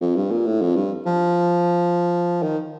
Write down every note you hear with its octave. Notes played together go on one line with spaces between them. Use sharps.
F2
G2
A#2
A2
F2
G2
F3
D#3